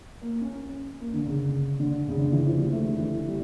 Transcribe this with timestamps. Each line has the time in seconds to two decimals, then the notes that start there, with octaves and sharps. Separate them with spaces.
0.22 A#3
0.41 C#4
0.61 C#4
1.01 A#3
1.14 D3
1.26 C#3
1.80 D3
2.08 C#3
2.19 D3
2.32 E3
2.46 F3
2.58 G3
2.72 A3
2.85 D3
2.98 E3
3.28 G3